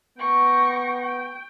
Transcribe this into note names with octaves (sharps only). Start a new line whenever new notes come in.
B3 G5 C#6 A#6
G5